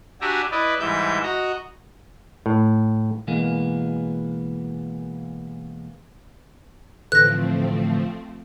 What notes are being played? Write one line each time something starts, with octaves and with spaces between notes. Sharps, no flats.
D4 F#4 G4 E5 G#5 A#5
E4 B4 D5 D#5
G#2 E3 G3 E5 G6
F#4 D#5 A#5
A2
B2 E3 G#3 A#3 B3
A2 D3 E3 F3 A3 C4 F#6 A#6